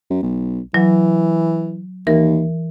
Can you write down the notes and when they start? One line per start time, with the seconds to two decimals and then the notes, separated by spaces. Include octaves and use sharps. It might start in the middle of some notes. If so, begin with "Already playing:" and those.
0.10 F#2
0.22 B1
0.74 E3 F#3
2.07 D#2 E3 A#4